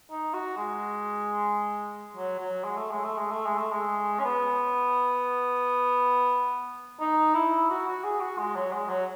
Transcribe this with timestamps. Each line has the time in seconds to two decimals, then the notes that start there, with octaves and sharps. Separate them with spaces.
0.11 D#4
0.34 F#4
0.57 G#3
2.17 F#3
2.40 F#3
2.64 G#3
2.77 A3
2.91 G#3
3.04 A3
3.18 G#3
3.32 A3
3.46 G#3
3.58 A3
3.72 G#3
4.19 C#4
4.25 B3
7.00 D#4
7.34 E4
7.70 F#4
7.87 F#4
8.04 G#4
8.20 F#4
8.39 G#3
8.56 F#3
8.73 G#3
8.90 F#3